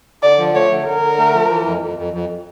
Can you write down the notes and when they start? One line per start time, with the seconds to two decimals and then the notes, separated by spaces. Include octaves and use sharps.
0.23 D3 D5
0.38 F3
0.55 A3 C#5
0.71 D3
0.86 D3 A#4
1.02 D3
1.18 A3
1.34 F3
1.50 E3
1.66 F2
1.82 F2
1.98 F2
2.13 F2